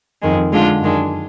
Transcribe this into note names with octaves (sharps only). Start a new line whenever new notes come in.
F2 D#3 G#3
D3 G#3 D4 F4
F#2 D#3 G#3 D4